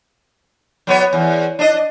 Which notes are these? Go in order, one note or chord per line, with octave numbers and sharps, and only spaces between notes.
F#3 B3 C#5
E2
D4 D#5